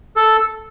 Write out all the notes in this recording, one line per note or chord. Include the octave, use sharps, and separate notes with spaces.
A4